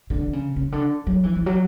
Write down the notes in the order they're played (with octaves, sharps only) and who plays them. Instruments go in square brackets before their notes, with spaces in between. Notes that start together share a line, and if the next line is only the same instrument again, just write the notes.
[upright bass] D3
C#3
C#3
D3
F#3
E3
E3
F#3